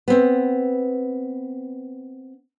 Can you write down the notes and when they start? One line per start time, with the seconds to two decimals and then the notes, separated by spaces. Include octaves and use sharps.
0.08 B3 C4